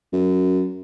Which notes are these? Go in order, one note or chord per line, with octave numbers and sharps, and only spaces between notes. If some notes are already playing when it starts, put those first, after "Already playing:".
F#2